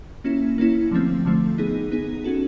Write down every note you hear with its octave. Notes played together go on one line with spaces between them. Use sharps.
A#3 C#4 E4
A#3 C#4 E4
D3 F3 A3 C4
D3 F3 A3 C4
B3 D#4 G#4
B3 D#4 G#4
C#4 F#4 A4